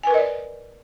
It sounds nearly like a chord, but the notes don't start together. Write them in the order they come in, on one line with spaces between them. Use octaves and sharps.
G#5 B4 A#4 D#5 D5